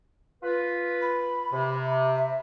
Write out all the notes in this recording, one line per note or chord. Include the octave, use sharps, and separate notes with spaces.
F4 B4
B5
C3
E5